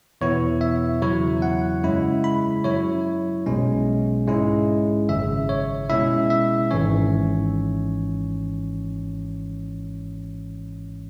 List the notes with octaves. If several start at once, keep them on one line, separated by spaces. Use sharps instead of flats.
E2 B2 B3 E4 C#5
E5
E2 C#3 F#3 E4 C#5
F#5
F#2 C#3 G#3 E4
B5
F#2 F#3 E4 C#5
B1 B2 G#3 C#4
G#2 G#3 C#4 E4
G#1 F#2 C#3 E5
C#5
B2 G#3 C#4 E4 E5
E5
G#1 G#2 E3 C#4 C#5